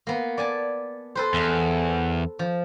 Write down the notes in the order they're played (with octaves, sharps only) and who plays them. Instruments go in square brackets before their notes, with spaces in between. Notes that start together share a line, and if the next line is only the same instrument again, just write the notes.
[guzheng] A#3 B3
D5 G#5 A5
A4 B4 C5
[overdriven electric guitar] E2
[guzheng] F3